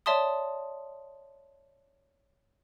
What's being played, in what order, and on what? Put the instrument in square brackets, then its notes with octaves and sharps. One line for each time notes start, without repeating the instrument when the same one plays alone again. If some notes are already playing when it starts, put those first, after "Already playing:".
[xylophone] C#5 D5 E5 A5 C6 D#6